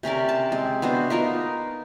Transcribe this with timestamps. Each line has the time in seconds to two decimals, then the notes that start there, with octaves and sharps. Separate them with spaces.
0.03 C3 C#4 A#4 D5
0.29 A5
0.52 G#3 C4
0.82 B3 D4 F#4 C5
1.10 B3 D#4 F4 A#4